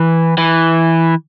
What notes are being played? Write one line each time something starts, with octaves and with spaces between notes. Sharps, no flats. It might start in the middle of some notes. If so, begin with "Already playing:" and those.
Already playing: E3
E3